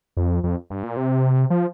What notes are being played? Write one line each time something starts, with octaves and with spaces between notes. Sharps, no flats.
F2
F2
G2
A#2
C3
F3